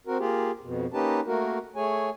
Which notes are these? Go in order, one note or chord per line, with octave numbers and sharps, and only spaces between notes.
C4 F#4 A#4
A#3 F4 G4 G#4
F2 B2
A#3 C#4 D#4 G4 B4 A5
A3 A#3 F#4 A#4
A3 G#4 C#5 G#5